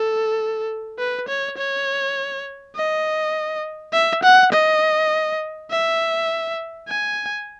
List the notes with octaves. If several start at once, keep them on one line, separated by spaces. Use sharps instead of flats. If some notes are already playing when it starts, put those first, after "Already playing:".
Already playing: A4
B4
C#5
C#5
D#5
E5
F#5
D#5
E5
G#5